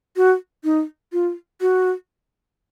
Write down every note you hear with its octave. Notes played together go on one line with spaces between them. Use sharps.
F#4
D#4
F4
F#4